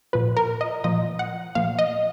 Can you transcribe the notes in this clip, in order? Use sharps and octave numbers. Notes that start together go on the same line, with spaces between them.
A#2 F3 B4
A#4
D#5
A#2 F3 D#5
F#5
A#2 F3 F5
D#5